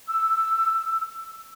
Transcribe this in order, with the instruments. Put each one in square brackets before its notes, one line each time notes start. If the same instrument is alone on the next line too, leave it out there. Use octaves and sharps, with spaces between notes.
[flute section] E6